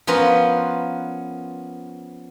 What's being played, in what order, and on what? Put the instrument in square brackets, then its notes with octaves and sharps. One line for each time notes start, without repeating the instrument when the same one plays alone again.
[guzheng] F3 B3 C#4 F4 A#4 B4